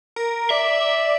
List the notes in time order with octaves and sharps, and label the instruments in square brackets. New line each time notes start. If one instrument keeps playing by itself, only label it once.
[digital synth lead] A#4
[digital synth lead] D5 [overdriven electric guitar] E5